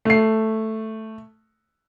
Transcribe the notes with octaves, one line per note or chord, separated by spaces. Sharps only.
A3 C7